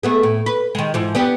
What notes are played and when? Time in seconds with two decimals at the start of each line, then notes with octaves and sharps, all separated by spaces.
0.03 A3 B3 G#4
0.23 A2
0.46 B4
0.75 D#3 G#3
0.94 G#2 E3 F3
1.15 B3 D4 G4